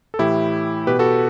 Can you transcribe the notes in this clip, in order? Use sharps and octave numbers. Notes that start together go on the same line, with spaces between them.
A4
A2 E3 E4 G4
B2 G4 B4
F#4 A4